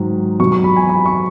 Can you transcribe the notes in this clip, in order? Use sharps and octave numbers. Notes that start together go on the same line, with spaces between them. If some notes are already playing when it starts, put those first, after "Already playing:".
Already playing: G#2 D#3 F#3
B2 F#3 C#6
C#6
B5
G#5
B5
C#6